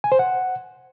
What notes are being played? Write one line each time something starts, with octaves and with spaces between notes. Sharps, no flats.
G#5
C5
F#5